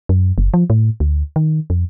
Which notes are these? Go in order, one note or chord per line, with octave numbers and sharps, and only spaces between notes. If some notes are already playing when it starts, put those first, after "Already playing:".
F#2
F#1
F3
A2
D2
D#3
F2